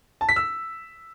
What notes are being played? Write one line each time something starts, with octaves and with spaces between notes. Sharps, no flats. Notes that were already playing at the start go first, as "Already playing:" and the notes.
A5
B6
E6